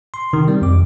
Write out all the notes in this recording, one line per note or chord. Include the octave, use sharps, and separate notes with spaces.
C6
C3 D#3
G3 C4
F2 D6